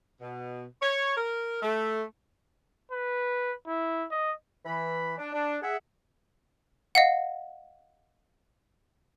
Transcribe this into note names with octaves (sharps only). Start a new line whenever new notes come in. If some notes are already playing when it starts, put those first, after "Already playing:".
B2
C#5
A#4
A3
B4
E4
D#5
E3 B5
D4
D4
G#4 E5 F#5
D#5 F5 F#5